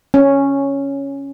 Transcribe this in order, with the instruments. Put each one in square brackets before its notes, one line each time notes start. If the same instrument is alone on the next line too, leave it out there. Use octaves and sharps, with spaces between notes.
[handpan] C#4